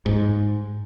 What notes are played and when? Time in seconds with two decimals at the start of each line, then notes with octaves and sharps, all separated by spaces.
0.06 G#2